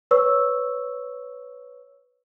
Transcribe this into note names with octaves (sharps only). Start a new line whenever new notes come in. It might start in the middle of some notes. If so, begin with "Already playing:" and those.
B4 C#5 C#6 E6